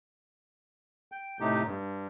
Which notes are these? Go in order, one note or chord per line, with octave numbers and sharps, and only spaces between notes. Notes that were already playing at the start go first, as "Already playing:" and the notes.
G5
A2 C3 A3 D#4 G4
G2